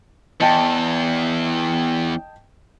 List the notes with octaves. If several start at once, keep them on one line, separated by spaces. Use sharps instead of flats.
E2 D#5 G5 A5